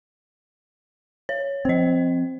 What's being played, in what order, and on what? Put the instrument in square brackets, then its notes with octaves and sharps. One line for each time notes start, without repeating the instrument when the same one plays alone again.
[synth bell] C#5
[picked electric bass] F3 C4 [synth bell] C5 D#5